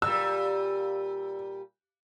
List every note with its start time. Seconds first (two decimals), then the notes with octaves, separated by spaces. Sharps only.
0.02 A#2 G3 E6